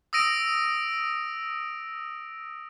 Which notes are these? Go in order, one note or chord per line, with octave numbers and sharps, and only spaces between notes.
D#6 E6 A#6 D7 D#7